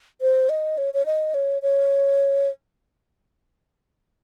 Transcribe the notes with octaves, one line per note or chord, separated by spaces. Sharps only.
C5
D#5
C#5
C#5
D#5
C#5
C#5